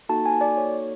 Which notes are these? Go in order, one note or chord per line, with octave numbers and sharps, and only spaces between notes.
A#3 D#4 F#4 A4 A5
G#5
D5
C#5